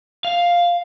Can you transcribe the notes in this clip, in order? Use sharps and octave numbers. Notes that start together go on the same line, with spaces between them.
F5